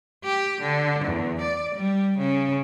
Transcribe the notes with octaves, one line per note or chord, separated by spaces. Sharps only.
G4
D3
E2
D5
G3
C#3